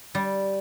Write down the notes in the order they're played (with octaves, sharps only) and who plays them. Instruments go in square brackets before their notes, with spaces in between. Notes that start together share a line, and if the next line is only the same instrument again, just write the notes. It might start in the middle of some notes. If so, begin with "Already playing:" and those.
[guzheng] G3